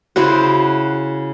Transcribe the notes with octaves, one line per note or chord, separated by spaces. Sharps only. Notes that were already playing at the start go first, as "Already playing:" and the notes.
C#3 E4 F#4 C5